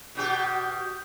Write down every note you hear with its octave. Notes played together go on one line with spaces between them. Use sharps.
B2 F#4 G4